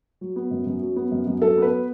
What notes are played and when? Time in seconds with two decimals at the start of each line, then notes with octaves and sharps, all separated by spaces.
0.21 F#3
0.36 B3
0.51 F#2
0.66 F#2
0.81 F#3
0.96 B3
1.12 F#2
1.27 F#2
1.42 F#3 A4
1.57 B3 B4